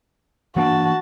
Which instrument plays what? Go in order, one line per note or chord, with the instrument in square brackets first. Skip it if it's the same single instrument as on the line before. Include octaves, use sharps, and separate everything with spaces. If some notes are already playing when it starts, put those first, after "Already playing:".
[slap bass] E3 A#3 D4 [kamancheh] F#4 A5